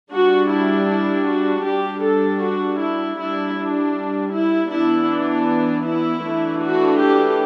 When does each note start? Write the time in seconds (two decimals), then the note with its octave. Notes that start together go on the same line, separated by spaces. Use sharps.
0.11 G3 D4 F#4
0.50 E4
0.89 E4
1.26 F#4
1.65 G3 D4 G4
2.03 A4
2.42 F#4
2.80 E4
3.18 G3 D4 E4
3.56 D4
4.33 E4
4.71 E3 B3 D4 E4
5.10 D4
5.86 E4
6.25 E3 A3 D4
6.63 F#4
7.01 G4